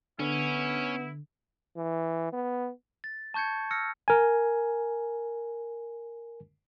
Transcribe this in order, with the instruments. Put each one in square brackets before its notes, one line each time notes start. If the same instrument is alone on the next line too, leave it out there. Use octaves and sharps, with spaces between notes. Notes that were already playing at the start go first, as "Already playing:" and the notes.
[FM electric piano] D3 [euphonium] B3 [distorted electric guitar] C#4 [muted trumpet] E4
[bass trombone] E3
B3
[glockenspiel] A6
A5 C#6 G6 G#6 C#7
E6 F6 A#6 C#7
[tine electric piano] A#4 G#5